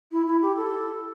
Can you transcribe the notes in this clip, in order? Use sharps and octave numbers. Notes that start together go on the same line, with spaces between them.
E4
E4
G4
A4